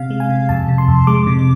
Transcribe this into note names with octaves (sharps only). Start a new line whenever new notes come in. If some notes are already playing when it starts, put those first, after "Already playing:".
Already playing: C3 F5
G#3
G#5
C3
F2 A5
C3
C6
F2
G#3 D6
C3